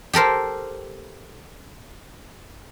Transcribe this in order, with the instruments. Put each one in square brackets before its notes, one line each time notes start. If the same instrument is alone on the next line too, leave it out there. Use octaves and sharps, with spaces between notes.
[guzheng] G4 A4 A#4 C5